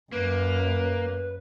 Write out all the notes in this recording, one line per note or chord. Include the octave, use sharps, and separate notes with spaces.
F#2 A#3 B4